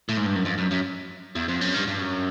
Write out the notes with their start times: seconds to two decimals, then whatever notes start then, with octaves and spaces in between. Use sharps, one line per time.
0.09 A2
0.17 G#2
0.26 G2
0.36 F#2
0.45 F2
0.58 F#2
0.71 F#2
1.35 E2
1.48 F2
1.61 F#2
1.74 G2
1.87 G2
1.99 F#2